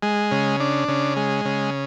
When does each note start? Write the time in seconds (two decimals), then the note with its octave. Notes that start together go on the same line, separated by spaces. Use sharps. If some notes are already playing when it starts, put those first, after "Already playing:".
0.03 G#3
0.31 C#3
0.60 D4
0.88 C#3
1.17 G#3
1.45 C#3